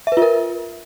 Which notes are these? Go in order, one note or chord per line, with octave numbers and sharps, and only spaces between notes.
F4 A#4 B4 E5